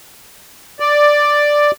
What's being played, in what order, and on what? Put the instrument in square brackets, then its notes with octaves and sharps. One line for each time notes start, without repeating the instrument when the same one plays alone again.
[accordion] D5